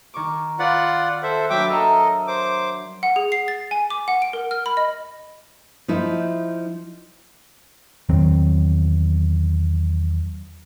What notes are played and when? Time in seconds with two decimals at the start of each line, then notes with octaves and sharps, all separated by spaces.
0.14 D#3 C#6 D6
0.59 F4 B4 D5 F#5
1.23 A4 C5 E5 F#6
1.50 F#3 D4 B4 E5 G5 D6
1.70 A4 A#4 D#5 E5 A#5
2.27 C5 D6
3.03 F#5
3.16 G#4
3.32 C7
3.48 A6
3.71 G#5
3.90 D6
4.08 F#5
4.22 D7
4.33 A#4
4.51 F6
4.66 B5
4.77 D#5
5.88 F3 D#4 E4
8.09 E2 D#3 F#3 C4